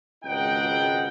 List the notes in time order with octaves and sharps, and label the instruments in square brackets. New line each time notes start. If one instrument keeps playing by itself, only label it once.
[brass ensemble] G#1 C#2 B2 D#4 F#5 G5